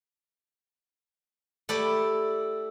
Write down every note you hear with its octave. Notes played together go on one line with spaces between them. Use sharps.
A3 E4 G4 A4 D5